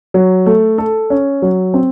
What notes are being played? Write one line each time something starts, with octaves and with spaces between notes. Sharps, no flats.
F#3
A3
A4
C#4
F#3
C4